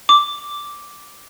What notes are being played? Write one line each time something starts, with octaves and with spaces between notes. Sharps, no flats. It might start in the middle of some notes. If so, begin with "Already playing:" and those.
D6